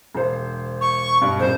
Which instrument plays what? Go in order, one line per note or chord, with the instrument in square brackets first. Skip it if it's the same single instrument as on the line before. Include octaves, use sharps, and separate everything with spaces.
[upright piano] E1 C5
[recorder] C#6
[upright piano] G2 B2
[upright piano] D#1 [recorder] C5